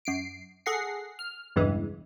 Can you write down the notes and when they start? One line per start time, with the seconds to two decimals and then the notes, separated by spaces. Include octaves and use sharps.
0.05 F#2 C7 D7
0.66 G#4 A4 F#5 A#6 C7
1.19 F6
1.56 B1 E2 G2 C#3 E3 G#3